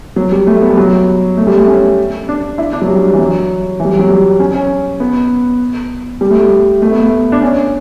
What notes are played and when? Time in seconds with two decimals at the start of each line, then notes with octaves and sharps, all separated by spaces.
0.16 F#3
0.32 G3
0.47 A3
0.62 B3
0.70 G3
0.78 F#3
1.37 A3
1.47 G3
1.56 A3
1.67 C#4
2.29 D4
2.58 E4
2.73 D4
2.82 F#3
2.88 G3
2.99 G3
3.13 E3
3.19 F#3
3.80 E3
3.85 G3
3.89 F#3
3.99 F#3
4.09 G3
4.40 C#4
4.54 C#4
5.00 B3
6.21 G3
6.31 A3
6.41 G3
6.82 A3
6.92 B3
7.00 A3
7.32 D4
7.42 C#4